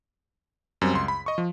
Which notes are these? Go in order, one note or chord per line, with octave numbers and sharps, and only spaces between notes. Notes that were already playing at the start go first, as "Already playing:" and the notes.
F#2 G3 C4
C#2 C6
B5
D#5 C#6
F3